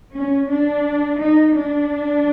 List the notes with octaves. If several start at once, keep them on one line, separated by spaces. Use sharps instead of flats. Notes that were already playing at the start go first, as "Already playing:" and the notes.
C#4
D4
D#4
D4